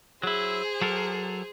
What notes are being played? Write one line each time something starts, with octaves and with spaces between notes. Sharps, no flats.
F#3 E4 G#4 C5
F#3 A4 A#4